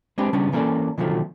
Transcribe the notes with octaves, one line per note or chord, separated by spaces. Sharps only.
G#3 C4 D4 G4 B4
C#3 G3 B3 C#4 D4
E3 A#3 C#4 A4 D5
B2 D3 D#3 F3 F#3 A3